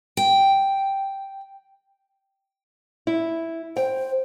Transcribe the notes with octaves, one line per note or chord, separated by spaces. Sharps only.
G5
E4
C5 G5